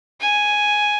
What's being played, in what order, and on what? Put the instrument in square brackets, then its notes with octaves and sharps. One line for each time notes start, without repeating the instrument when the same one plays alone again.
[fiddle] G#5